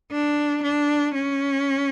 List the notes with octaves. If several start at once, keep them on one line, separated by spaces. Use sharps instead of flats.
D4
D4
C#4